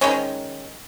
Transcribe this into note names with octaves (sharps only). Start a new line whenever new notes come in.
D#3 G#3 C#4